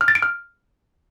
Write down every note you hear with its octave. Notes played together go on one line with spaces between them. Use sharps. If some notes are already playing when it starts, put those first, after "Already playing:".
F6
A6
D7
F6